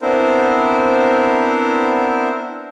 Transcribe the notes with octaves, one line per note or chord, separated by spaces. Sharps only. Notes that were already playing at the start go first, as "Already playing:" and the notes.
B3 C4 D4 E4 A#4 C5